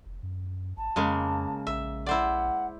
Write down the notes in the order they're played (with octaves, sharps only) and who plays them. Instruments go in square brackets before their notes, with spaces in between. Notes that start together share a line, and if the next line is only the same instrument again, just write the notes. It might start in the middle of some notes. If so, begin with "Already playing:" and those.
[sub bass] F1
F#2
[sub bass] G#1 [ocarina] A5
[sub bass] F2 [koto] C#3 G#3 A#3
[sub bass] A#1 [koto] E5
[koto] E4 C5 D5 [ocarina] F#5